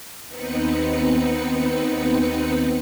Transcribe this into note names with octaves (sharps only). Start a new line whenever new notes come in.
D#2 B3 C4 D#4 B4 C#7